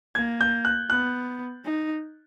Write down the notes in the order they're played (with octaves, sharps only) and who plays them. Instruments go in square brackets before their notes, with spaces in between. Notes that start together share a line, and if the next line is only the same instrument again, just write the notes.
[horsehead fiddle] A#3 [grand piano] G#6
[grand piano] G6
F#6
[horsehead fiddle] B3 [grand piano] F#6
[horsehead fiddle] D#4